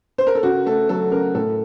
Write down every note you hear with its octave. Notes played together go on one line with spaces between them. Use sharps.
C5
A#4
A4
C#3 F#4
A3 A4
F#3 A4
C#3 A#4
A2 A4